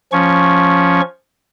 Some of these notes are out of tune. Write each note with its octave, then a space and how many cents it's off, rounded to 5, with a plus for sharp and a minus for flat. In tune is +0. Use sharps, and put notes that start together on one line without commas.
F3 +5 C#4 +0 C#6 +0